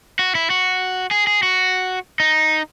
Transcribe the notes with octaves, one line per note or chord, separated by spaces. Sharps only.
F#4
E4
F#4
G#4
G#4
F#4
D#4